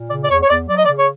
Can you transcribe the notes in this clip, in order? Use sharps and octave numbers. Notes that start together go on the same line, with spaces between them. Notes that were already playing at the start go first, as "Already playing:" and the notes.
Already playing: A#2
C#3 D5
D5
E2 C#5
C#5
E2 D5
F#3 D5
D#5
D5
C#3
C#5